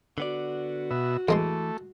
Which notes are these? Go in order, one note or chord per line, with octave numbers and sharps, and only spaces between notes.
D3 B3 F#4 D5
B2 E5
E2 E3 G#3 A3 C6